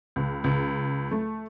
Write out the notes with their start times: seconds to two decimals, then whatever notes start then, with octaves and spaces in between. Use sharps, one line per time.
0.16 C#2
0.44 C#2
1.11 A3